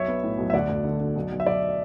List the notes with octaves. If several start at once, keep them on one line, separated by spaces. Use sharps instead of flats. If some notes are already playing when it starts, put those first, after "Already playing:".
Already playing: B1 C#5 E5
B3
A2
B1
E5
D2 D5 F#5
D2
D3
D3
B1
B1
E5
B1 D5